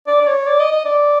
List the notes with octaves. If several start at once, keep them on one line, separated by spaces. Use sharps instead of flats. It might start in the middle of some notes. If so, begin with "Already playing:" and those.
D5
D5
C#5
D5
D#5
D#5
D5